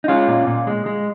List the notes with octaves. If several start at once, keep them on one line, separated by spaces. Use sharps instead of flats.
D#4
G#3 C#4 F4
A#2
A#2
G#3
G#3